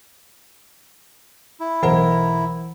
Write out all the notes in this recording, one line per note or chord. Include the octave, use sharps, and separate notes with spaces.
E4
B1 E3 A#4 C5 F#5